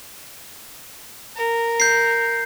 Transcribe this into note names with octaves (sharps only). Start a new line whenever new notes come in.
A#4
G6 C7